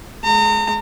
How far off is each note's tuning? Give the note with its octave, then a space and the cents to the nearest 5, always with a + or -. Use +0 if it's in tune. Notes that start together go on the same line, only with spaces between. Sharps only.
G#3 +25 A#5 -35